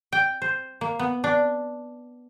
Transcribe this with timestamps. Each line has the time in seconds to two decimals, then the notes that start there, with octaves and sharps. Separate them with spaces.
0.12 G5
0.42 C5
0.81 A#3
0.99 B3
1.24 D4